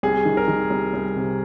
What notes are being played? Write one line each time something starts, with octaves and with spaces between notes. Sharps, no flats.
C2 G#4
D#3
A#4
D#3
C2
C2
C3